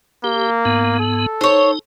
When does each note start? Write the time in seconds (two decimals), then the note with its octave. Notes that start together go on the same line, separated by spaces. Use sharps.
0.24 A#3 G4
0.65 G#2 B3
0.99 A4
1.41 D#4 C5 C#5